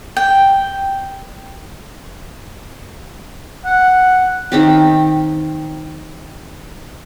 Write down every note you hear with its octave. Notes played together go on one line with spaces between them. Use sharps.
G5
F#5
D#3 C4 G4